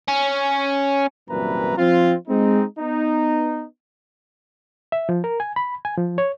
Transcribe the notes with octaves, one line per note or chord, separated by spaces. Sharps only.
C#4
C2 F#2 A#2 E3 B4 A#5
F3 C4 F4
G#3 C4 D#4
B3 D#4
E5
F3
A#4
G#5
B5
G#5
F3
C#5